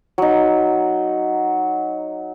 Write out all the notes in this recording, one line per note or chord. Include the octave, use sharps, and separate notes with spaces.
F#3 D#4